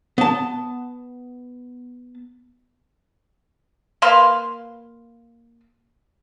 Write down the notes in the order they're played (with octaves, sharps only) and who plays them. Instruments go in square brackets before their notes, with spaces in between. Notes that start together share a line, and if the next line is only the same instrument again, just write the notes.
[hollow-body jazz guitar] B3 A5
[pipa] A#3 B4 F5 C6